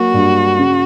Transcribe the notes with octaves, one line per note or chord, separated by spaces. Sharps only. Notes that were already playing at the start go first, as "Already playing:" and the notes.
Already playing: F#3 A#3 F#4
G2
C#3